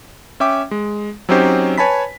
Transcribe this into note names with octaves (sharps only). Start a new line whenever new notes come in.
C#4 E5 G5 D6
G#3
F#3 C4 C#4 D#4 G4 C5
B4 C#5 G#5 A5 B5 B6